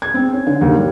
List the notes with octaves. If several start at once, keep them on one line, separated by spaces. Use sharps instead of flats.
G#6
C4
C#4
D3
D#2
G3